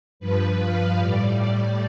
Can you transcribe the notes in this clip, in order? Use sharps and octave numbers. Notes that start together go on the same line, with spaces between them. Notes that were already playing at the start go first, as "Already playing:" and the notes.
G2 F3 B4
F5
A2 G3 D5